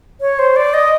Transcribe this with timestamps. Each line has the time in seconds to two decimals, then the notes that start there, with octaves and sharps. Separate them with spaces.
0.21 C#5
0.39 C5
0.56 D5
0.74 D#5